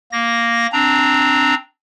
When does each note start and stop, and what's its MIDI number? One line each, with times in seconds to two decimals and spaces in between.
0.12 0.66 58
0.12 0.66 94
0.72 1.54 60
0.72 1.54 62
0.72 1.54 82